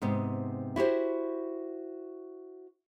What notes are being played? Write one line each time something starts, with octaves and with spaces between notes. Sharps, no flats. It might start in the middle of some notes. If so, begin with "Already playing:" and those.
G#2 C3 B3
E4 F#4 G4 C5